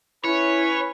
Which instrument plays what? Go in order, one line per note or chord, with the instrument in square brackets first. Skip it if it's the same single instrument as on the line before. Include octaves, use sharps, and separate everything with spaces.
[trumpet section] C#4 B4 B5 [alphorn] E4 [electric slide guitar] C#5